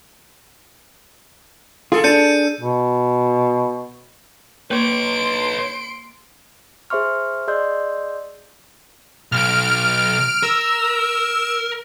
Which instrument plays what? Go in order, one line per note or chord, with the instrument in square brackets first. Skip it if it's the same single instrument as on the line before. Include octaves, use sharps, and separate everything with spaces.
[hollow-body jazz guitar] F4 [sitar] G#4 A4
[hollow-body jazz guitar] D4 [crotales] G6 C#7 D#7
[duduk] B2
[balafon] A#3 [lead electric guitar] B4 C#5 [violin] C6 D7
[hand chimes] G#4 C5 E5 C6 C#6 F6
G#4 D5 D#5 C6 E6 G6
[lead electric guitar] B1 [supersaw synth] F6 D7
[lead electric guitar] A#4 [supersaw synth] E6